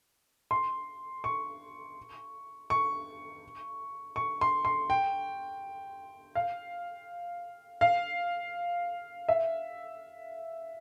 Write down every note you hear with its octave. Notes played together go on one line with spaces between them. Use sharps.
C6
C#6
C#6
C#6
C6
C6
G5
F5
F5
E5